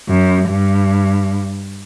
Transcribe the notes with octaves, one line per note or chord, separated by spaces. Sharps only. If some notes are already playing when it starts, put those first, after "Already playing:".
F#2
G2